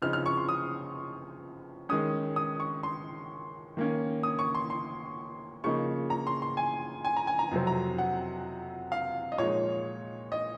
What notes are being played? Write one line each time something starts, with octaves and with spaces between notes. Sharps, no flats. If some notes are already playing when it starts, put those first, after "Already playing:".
C#3 F3 C4 D#4 F6
F6
C#6
C6
D#6
D#3 G#3 C#4 D#6
D#6
C#6
C6
D#3 A#3 C#4
D#6
C#6
C6
C6
C#3 F3 A#3 D#4 C#6
A#5
C6
C6
G#5
G#5
A#5
G#5
A#5
F2 C3 F#3 C4
A#5
F#5
F5
D#5
A#2 F3 G#3 D#4 C#5
D#5